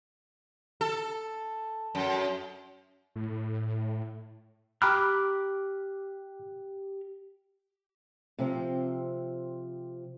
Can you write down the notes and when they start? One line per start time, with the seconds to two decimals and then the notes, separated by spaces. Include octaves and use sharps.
0.81 A4
1.95 F#2
3.16 A2
4.82 G4 G5 A#5 B5 D6 F6 F#6
8.39 C3 F3 C4